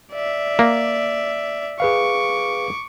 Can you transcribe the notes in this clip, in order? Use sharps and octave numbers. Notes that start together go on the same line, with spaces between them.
D5 E5
A#3
G#4 B4 F5 C#6 D6